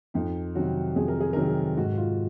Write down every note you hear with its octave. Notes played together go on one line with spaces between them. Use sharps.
F2 D#4
C3 D#3 F#3 F#4
F2 G#4
A#4
G#4
C3 D#3 F#3 A#4
G#4
G#2 F#4
F4